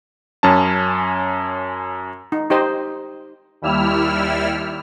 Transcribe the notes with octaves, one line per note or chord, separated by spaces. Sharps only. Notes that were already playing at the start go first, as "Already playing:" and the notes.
F#2 C#4 A5
D#4
D#4 G4 C5 D#5
D#2 G3 E4 E6 F6